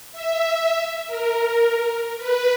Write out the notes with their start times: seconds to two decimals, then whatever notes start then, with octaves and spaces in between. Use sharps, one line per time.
0.12 E5
1.07 A#4
2.18 B4